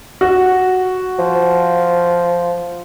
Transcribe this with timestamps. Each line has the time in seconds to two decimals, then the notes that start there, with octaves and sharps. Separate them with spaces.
0.21 F#4
1.18 F3